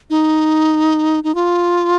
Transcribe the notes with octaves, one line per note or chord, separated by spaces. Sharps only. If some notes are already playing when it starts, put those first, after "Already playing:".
D#4
D#4
F4